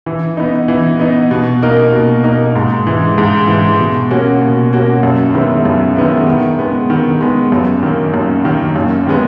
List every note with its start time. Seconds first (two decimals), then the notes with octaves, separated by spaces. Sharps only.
0.06 E3
0.37 B3 D#4
0.68 E3
0.99 B3 D#4
1.31 B2
1.62 A#3 D#4 A#4
1.92 B2
2.24 A#3 D#4 A#4
2.55 G#2
2.87 E3 G#3
3.18 G#2
3.48 E3 G#3
3.80 B2
4.10 A#3 C#4 F#4
4.42 B2
4.73 A#3 C#4 F#4
5.03 F#2
5.34 D#3 G#3 B3 E4
5.65 F#2
5.96 D#3 G#3 B3 E4
6.27 D#3
6.59 G#3 B3
6.90 D#3
7.21 G#3 B3
7.52 F#2
7.83 D#3 A#3
8.14 F#2
8.45 D#3 A#3
8.76 F#2
9.07 D#3 G#3 B3